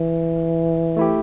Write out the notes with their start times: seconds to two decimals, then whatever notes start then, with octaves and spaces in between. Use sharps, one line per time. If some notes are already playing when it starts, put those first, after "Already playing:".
Already playing: E3
0.97 A3 E4 G4